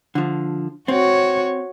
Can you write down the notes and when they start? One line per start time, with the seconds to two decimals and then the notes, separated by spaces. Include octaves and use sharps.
0.15 D3 F3
0.88 C4 F#4 C#5